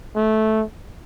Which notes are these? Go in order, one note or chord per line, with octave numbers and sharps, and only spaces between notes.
A3